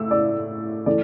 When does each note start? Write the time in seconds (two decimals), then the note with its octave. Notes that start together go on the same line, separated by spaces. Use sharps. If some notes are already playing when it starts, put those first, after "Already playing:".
Already playing: A2 E6
0.11 D5
0.86 E3 A3 D5